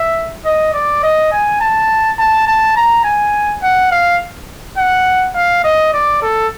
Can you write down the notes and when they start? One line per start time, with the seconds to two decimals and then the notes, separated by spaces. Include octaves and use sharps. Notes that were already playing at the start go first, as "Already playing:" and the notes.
Already playing: E5
0.45 D#5
0.74 D5
1.03 D#5
1.32 G#5
1.61 A5
2.19 A5
2.48 A5
2.76 A#5
3.05 G#5
3.63 F#5
3.92 F5
4.78 F#5
5.36 F5
5.64 D#5
5.93 D5
6.22 A4